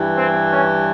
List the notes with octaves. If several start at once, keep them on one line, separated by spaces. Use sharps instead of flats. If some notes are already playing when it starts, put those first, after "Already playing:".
Already playing: G2 E3
C4
C#4